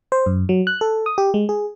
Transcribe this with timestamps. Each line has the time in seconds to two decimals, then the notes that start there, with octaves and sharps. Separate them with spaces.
0.12 C5
0.26 F#2
0.49 F#3
0.67 F#6
0.81 A4
1.06 D#6
1.18 G4
1.34 G#3
1.49 G#4